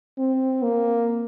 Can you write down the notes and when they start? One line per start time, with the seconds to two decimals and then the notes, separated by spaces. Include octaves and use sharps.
0.18 C4
0.62 A#3